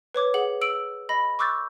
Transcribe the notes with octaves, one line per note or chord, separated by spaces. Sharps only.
B4 C#5 D6 G#6
G#4 F#5 F#7
E6 D7 F#7
D#5 B5 A#6
C#6 D6 E6 F#6 G6 A6